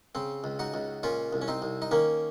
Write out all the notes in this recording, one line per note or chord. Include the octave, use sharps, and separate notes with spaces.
C#3 C4
C#2
D#4 F#4
C#2
A#2 C#4 F4
C2
C#4
C4 D#4
C2
D#4
D#3 A#3 C#4